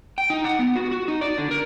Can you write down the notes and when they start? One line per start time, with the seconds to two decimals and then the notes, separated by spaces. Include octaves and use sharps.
0.18 G5
0.30 D#4
0.44 F#5
0.59 B3
0.76 F#4
0.91 F#4
1.08 D#4
1.21 D5
1.38 D3
1.51 A#4